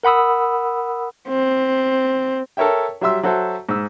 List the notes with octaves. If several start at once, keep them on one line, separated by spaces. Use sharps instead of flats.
A#4 F#5 B5 D#6 E6
C4
A4 A#4 C#5 E5 G5
F#3 G3 E5 C6 E6
F#3 F#4 A4 C5 E5
G#2 E6